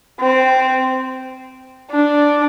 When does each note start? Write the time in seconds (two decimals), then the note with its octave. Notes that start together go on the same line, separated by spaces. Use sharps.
0.20 C4
1.92 D4